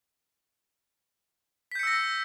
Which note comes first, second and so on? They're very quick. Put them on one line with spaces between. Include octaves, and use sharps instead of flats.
B6 G6 C#7 E6 A#6